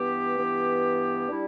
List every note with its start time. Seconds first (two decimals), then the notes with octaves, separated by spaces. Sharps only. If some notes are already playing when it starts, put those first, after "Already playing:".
Already playing: G2 E3 B3 G4
0.38 G2 E3 B3
1.28 G3 D4 E4